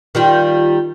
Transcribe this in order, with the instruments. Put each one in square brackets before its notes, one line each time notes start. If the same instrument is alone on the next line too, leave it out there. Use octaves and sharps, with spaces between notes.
[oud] D#3 G3 F4